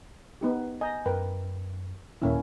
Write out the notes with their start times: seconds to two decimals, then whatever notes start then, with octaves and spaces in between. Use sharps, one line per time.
0.41 B3 D#4 G4
0.81 D#5 G#5 A#5 G6
1.06 F#2 A#4 B4 G5
2.22 D#2 A#2 D#3 A#3 C#4 E4